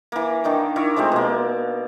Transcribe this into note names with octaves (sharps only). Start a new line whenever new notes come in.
E3 A#3
D#3 D4 D#4 C#6
D4 E4 A#4 C#6
F3 G#3 A3 C4
B2 A#3